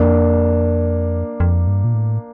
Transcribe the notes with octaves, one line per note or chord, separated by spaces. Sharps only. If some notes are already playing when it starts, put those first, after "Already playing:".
Already playing: F2 A#3 D4
F2
G2
A#2
A2